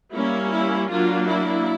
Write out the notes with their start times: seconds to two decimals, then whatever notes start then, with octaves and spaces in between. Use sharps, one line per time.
0.13 G3 A#3 C#4 E4
0.52 E4
0.89 F#3 A#3 D4 F4
1.28 E4